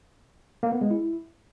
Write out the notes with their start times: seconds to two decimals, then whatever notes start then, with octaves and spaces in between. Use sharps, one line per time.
0.63 A#3
0.72 B3
0.81 G#3
0.91 E4